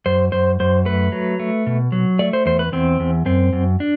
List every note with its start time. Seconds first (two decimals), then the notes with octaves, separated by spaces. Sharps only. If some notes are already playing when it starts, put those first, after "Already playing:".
0.06 F#2 C5
0.32 F#2 C5
0.60 F#2 C5
0.85 A3 B4
1.12 F#3
1.40 A3
1.67 B2
1.92 F#3
2.19 A3 D5
2.33 C5
2.46 E2 C5
2.59 B4
2.72 E2 C4
3.00 E2
3.26 F#2 C4
3.53 F#2
3.80 D4